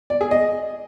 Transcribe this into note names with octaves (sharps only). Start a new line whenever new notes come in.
D5
G#4
D#5